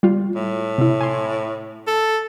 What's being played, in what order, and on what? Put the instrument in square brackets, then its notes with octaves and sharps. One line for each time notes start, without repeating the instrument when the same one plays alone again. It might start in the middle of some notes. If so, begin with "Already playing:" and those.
[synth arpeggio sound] G3 F4
[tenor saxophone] A2
[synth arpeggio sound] C3 E4
G#5 C6
[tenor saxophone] A4